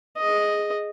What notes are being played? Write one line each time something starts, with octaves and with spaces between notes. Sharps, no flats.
G#4 D#5